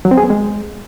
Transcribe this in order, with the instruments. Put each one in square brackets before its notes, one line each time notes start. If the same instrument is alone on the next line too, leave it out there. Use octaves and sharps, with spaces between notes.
[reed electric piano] F#3
C4
G#4
B3
G#3